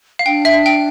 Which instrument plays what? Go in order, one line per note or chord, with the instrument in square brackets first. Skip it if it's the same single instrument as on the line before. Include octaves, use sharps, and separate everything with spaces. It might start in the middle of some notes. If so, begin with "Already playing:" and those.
[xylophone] F5
[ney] D4 [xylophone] G5
[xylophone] E5
G5